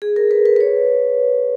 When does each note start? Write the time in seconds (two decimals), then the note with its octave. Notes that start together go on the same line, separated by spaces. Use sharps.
0.02 G#4
0.16 A#4
0.31 B4
0.46 B4
0.56 B4
0.61 C#5